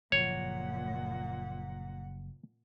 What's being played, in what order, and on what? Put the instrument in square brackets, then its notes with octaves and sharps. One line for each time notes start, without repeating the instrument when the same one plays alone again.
[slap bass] F#1 F3 [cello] A#2 F#5 [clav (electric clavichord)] C#5